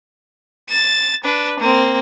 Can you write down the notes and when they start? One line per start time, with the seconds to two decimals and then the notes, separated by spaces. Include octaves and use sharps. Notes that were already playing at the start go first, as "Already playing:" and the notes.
0.69 A6 E7
1.24 D4 B4
1.60 A#3 C4